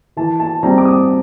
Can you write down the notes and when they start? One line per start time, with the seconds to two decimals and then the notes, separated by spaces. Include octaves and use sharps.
0.17 E3 A5
0.40 A5
0.63 G3 C4 A#5
0.78 D6
0.85 D#6